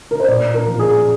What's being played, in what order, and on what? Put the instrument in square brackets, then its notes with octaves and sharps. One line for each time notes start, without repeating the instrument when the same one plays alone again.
[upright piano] A#4
C5
A#2 D5
A#4
F3
G#4